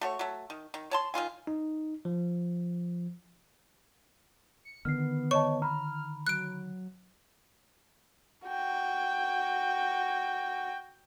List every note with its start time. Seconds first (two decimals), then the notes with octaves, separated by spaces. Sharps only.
0.01 A3 F#4 C#5
0.19 F#3 A3
0.50 D#3
0.74 D#3
0.91 C#5 A5 C6
1.14 D#3 D#4 F4 G#5
1.47 D#4
2.05 F3
4.65 C#7
4.85 D3 D#3 B3 F6 C7
5.31 C#5 D#5 A5 C#6
5.62 A#5 B5 F6
6.27 F#3 F#6 D7
8.48 F#4 G5